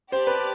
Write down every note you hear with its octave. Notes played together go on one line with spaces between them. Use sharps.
G4 C5 D5 A5
B4